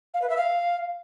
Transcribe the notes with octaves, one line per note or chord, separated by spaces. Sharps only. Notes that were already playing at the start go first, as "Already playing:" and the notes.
F5
B4
E5
F5